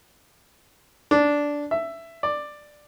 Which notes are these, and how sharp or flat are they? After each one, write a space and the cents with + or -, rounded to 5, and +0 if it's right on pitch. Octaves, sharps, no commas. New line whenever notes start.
D4 -10
E5 +10
D5 +10